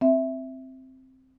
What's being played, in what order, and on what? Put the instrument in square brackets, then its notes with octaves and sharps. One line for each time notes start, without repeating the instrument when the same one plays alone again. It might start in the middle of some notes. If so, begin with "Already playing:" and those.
[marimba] C4 E5